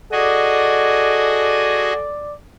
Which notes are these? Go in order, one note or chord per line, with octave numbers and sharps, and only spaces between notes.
F#4 G#4 A4 D5 D#5